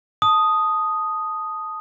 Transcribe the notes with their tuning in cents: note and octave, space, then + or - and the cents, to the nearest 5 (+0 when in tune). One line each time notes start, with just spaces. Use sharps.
A5 +0 D#6 +0